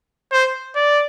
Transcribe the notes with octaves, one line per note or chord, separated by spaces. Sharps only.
C5
D5